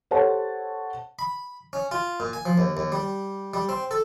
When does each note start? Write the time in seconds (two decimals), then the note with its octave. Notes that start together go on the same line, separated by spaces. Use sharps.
0.11 G4 A4 C5 C#5 F#5 A5
1.19 B5
1.73 C#4
1.91 F4
2.20 A#2
2.33 G#5
2.46 F3
2.58 D#2
2.77 D#2
2.92 G3
3.54 G3
3.69 C4
3.91 A4